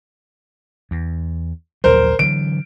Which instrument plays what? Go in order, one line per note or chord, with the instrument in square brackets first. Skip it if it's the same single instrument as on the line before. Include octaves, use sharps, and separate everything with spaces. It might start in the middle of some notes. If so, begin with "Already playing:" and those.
[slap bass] E2
[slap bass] A#1 D#2 F#3 [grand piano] A#4 C5
[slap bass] D3 E3 F#3 [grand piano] D7